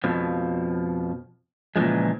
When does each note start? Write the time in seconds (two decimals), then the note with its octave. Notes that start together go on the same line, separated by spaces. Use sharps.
0.04 F2 B2 F3
1.76 A#2 C#3 E3 F3 G#3